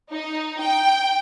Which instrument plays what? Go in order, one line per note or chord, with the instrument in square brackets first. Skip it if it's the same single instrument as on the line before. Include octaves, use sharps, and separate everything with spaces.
[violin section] D#4
G5